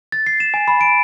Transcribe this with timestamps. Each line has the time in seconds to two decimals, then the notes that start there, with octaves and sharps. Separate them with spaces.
0.12 A6
0.27 C7
0.40 E7
0.54 G#5
0.68 B5
0.81 D7